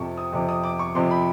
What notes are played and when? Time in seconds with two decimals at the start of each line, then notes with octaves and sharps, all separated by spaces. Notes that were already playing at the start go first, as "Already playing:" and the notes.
Already playing: F2 C3 F3 A5 C#6
0.17 D#6
0.32 F2 C3 F3 D6
0.49 D#6
0.64 D6
0.79 C#6
0.95 F2 C3 F3 C6
1.11 B5